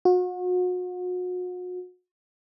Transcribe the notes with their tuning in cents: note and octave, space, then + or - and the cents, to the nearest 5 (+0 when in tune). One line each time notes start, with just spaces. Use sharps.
F#4 -35